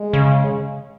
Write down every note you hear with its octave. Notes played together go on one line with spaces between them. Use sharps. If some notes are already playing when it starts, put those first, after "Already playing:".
Already playing: G#3
C#3